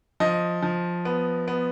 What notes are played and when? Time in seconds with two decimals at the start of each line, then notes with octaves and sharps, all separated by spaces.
0.20 F3 D#5
0.62 F3
1.05 B3
1.48 B3